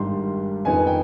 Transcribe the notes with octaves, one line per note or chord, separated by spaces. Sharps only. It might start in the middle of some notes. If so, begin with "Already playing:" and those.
Already playing: G#1 G2 D#3 G3 C6
F2 D#3 B3 D#4 G#5
G5